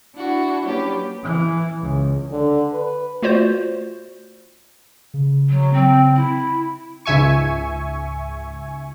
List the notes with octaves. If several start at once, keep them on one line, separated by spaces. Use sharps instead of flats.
D4 E4 F#4
F#3 A#3 C#4 D4 G4 B4
E3
C#2
D3
B4
A3 F4 F#4 C5 D5
C#3
F#3
C4
E4
C#2 G#2 E5 G#5 C#6